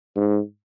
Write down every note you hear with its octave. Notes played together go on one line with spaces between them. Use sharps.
G#2